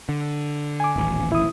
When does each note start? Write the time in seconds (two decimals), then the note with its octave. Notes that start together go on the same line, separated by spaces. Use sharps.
0.09 D3
0.80 G#5 D6
0.96 D#1 A1
1.32 E4 D#6